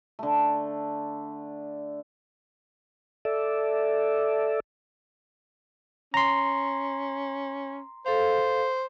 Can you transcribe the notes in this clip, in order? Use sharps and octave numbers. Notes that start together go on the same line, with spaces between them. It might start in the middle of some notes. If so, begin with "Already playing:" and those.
D3 A3
A4 D5 E5
C#4 A#5 C6
A4 C5 F5